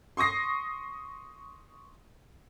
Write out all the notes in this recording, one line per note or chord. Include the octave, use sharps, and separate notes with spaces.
C6 C#6 D#6 A#6 C7